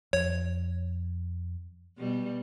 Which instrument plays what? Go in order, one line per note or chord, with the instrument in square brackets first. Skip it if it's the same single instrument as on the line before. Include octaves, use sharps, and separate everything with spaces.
[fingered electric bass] F2 [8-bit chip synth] C#5
[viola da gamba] B2 G3